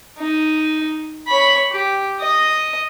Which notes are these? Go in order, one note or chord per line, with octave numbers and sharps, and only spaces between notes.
D#4
C#5 B5
G4
D#5